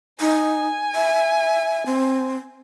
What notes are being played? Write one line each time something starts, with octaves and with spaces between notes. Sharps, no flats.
D#4 G#5
E5
C4